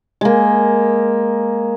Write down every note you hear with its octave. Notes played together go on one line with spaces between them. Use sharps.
G#3 A#3